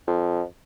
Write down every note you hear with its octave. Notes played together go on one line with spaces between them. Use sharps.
F2